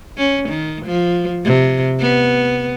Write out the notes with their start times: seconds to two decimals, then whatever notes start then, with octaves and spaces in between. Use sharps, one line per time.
0.18 C#4
0.49 D#3
0.86 F3
1.45 C3
2.01 B3